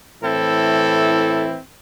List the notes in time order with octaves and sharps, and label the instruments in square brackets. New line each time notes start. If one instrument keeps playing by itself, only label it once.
[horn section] A2 E3 C4 E4 A4